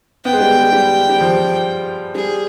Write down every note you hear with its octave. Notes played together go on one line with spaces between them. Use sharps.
B3 G5
G#3
G3
G#3
G3
G3
F3
G3 G#4